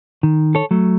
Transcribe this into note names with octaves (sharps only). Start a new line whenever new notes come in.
D#3
A4 C#5
F#3 A3